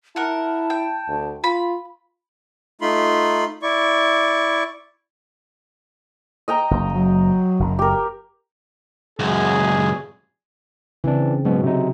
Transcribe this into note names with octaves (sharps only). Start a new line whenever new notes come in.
E4 A#4 F#5 A5
G5
D2
F4 B5
A3 D#4 F4 B5 C6
E4 D5 C#6
D#5 G5 A#5
F#1
F#3
F#1 F#2
G4 A#4
C#2 F#2 G#4
C#3 E3 C4 D4
G#2 B2 F#3
C3 D#4